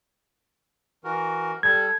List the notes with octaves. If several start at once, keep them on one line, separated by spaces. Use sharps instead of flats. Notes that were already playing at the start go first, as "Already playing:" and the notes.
E3 F#4 A#4
G3 A4 G#6